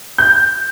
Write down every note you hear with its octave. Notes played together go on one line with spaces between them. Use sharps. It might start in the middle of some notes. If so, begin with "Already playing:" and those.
G6